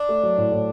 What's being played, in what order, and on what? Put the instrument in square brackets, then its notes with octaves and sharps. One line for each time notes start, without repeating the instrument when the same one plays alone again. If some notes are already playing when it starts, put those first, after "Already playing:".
Already playing: [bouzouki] D4
[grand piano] A3
F#3
A2
A2